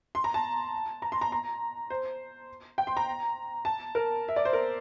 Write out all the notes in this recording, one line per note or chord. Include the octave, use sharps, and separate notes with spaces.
C6
A#5
A5
A#5
C6
A#5
A#5
C5
G5
C6
A#5
A5
A#4
E5
D5
C5
A#4